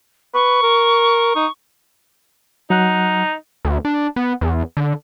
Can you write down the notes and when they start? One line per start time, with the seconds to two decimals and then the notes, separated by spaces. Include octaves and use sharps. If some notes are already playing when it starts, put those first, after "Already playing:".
0.34 B4 C#6
0.63 A#4
1.36 D#4
2.70 F#3 D#4 F#5 F#6
3.65 D2
3.85 D4
4.16 B3
4.41 E2
4.77 D3